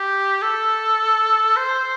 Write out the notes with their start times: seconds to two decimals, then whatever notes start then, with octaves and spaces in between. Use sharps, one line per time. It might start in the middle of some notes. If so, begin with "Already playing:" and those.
Already playing: G4
0.42 A4
1.57 C5